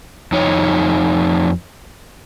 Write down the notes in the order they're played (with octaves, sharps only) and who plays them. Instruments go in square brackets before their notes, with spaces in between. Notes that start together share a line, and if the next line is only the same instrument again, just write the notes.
[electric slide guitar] F2 D#4 C#5